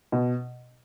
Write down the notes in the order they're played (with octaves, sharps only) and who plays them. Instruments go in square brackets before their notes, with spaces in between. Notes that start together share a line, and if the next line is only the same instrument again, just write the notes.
[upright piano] B2